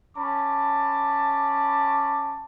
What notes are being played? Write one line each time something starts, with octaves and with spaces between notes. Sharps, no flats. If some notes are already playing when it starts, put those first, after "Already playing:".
C#4 A5 B5 D6